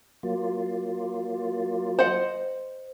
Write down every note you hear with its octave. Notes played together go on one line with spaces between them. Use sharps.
F#3 A#3 F4
C5 D#5 F#5